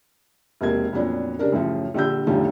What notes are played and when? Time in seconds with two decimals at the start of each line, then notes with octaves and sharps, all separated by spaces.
0.61 E1 C3 A#3 G#6
0.93 F2 A#2 F#3 B3 D4
1.39 C#3 G3 D4 A#4
1.52 A1 F#2 C#3 F3
1.94 A#1 D3 G3 E6 G6
2.27 B1 E2 A2 D3 F3 G3